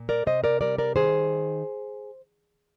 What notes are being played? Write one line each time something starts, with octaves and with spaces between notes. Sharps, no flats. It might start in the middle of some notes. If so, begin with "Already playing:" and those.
Already playing: A#2
A#4 D5
C3 C5 D#5
A#4 D5
G3 A#4 D5
A#4 D5
D#3 G#4 C5